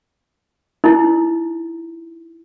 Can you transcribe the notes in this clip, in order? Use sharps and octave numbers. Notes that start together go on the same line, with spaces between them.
D#4 E4